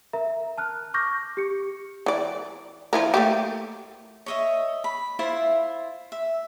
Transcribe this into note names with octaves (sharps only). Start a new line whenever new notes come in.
A#4 E5 A#5
A5 F6 F#6
C#6 D6 F6 G6 A#6
G4 C#7
E3 D5
F3 E4 A#4
A3 A#3 G4
C#5 D#5 E5
B5
E4 F4 C5 E5
E5